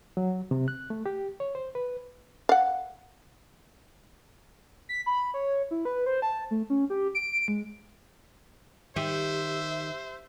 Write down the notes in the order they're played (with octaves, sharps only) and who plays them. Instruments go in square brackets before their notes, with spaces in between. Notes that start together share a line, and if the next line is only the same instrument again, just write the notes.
[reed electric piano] F#3
C3
F#6
A3
G4
C#5
C5
B4
[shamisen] F5 F#5
[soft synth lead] B6
B5
C#5
E4
B4
C5
A5
A3
C#4
G4
D7
G#3
[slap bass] D#3 [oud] G4 [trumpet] C5 [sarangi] E5